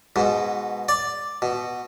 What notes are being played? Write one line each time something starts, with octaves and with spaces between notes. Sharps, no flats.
G#2 B2
D5
B2